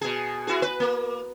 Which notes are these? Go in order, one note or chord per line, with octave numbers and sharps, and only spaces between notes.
B2 G#4
E4 F#4 G#4
B4
A#3